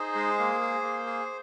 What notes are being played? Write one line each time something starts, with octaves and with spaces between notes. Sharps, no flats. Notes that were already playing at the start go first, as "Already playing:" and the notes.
Already playing: D#4 G#4 C5
G#3
A#3
G#4
A#3
G#4